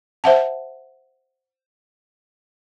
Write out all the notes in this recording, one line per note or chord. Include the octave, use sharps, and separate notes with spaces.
C5 E5 F#5 A5